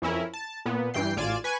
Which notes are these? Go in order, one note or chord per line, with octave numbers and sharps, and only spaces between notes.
F2 C#4 E4 A#4
A5
A#2 B3
G2 E3 G5 C7
A1 F4 D5 G#5 D7 E7
B4 G#5 C#6